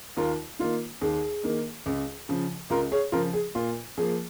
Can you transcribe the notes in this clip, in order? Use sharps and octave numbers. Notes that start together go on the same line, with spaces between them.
D#2 F4 A#4
D#3 A#3 F4
D#2 G#4
D#3 A#3
C#2
C#3 F3
C#2 F4 A#4
G#4 C#5
C#3 F3 F4 A#4
G#4
A#2 F4
F3 A#3 G#4